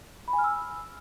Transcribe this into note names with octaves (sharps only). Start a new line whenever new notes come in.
B5
G#5
F6
E6